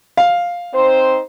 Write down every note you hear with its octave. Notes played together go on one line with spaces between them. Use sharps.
F5
C4 D#4 C5